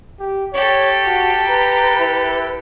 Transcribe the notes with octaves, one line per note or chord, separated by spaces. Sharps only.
G4
G4 A4 C#5
F#4 A5
B4 A#5
E4